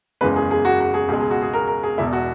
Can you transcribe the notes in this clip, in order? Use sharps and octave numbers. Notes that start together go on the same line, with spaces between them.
F#1 E2 C#3 G#3 B4
G#4
G#4
F#4
F#4
G#4
C#2 B2 G#3 G#4
G#4
F#4
G#4
A#4
A#4
G#4
E1 E2 B2 E4
F#4